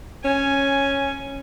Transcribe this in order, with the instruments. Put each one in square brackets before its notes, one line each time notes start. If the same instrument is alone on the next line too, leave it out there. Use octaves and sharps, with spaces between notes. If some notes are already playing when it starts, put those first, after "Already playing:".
[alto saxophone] C#4 [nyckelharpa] G#5